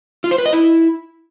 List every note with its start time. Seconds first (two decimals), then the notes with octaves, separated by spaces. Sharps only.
0.24 F4
0.31 C5
0.38 B4
0.46 D#5
0.53 E4